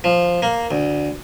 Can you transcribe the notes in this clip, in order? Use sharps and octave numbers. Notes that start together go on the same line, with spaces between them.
F3
A#3
D2